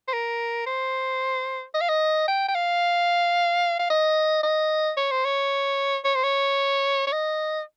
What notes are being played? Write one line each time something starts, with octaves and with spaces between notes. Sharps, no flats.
C5
A#4
C5
D#5
F5
D#5
G5
G5
F5
F5
D#5
D#5
C#5
C5
C#5
C#5
C5
C#5
C#5
D#5